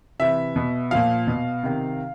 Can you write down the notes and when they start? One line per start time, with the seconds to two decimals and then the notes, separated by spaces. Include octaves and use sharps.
0.19 C3 E3 E5
0.56 B2
0.91 A#2 F3 F5
1.27 B2
1.63 C3 D#3